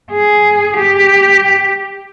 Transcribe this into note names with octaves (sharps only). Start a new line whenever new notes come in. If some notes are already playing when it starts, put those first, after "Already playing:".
G#4
G4